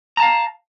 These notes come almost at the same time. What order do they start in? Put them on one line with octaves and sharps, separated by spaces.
A#5 A5 F5